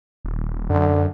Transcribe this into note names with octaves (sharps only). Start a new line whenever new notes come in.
D#1
F#2 D3